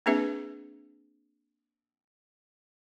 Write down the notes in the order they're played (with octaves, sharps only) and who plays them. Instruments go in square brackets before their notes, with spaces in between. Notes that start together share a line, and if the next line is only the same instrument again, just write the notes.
[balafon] A#3 C4 D4 G#4 B4 E5